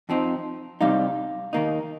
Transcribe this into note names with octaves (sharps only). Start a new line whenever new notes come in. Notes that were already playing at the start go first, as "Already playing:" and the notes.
F2 F3 C4 D#4
C3 G3 C4 D#4 F5
D#2 D#3 A#3 D#4